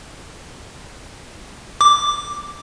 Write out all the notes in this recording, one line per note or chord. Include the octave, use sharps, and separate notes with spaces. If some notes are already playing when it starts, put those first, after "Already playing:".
D6